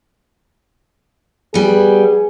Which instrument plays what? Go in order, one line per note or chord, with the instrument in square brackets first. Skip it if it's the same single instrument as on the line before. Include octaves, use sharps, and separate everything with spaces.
[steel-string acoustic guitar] G3 B3 [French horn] G#4